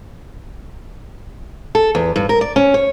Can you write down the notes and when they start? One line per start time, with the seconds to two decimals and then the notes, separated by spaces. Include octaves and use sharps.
1.75 A4
1.95 E2
2.16 G2
2.29 A#4
2.41 D5
2.56 C#4
2.74 C#5